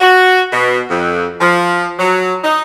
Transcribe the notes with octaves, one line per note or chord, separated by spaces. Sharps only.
F#4
B2
F2
F3
F#3
D#4